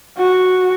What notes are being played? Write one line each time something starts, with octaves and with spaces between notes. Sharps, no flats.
F#4